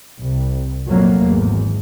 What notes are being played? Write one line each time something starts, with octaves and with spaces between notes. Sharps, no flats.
C2
F2 A#2 F#3 A3 A#3
G#1 E2